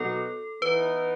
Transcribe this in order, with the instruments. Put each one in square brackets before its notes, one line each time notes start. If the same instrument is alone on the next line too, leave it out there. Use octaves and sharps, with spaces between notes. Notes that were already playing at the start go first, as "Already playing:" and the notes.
Already playing: [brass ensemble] B2 F#3 B3 D#4 F#4 [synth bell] A4
[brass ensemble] E3 B3 D#4 [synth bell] B4